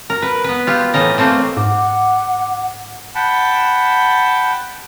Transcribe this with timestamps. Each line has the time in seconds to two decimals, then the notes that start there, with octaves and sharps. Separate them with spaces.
0.10 A#4
0.22 B4
0.44 B3 B4
0.67 F4 G4
0.94 A2 E3 A#4 D#5
1.18 A3 A#3 C4
1.57 G#2 F#5 D6
3.15 F#5 G5 A5 B5